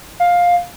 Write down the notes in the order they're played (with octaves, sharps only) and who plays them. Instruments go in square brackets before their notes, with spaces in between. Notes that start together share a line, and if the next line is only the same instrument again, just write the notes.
[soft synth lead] F5